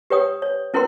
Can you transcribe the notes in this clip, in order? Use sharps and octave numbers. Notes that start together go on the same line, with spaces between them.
G4 B4 C#5 G5 D#6
C#5
C#4 E4 A#4 B4 G5 C6